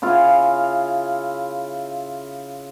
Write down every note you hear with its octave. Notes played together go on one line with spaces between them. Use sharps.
C#3 E4 F4 F5